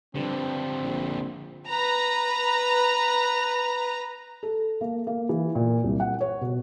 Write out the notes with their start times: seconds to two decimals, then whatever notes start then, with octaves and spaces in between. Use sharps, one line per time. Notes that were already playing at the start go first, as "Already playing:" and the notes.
0.15 G2 D3 F3 C4
0.84 A#1
1.65 B4 A#5
4.43 A4
4.81 A#3
5.07 A#3
5.29 E3
5.55 A#2
5.84 C2
6.00 F#5
6.21 C#5
6.41 B2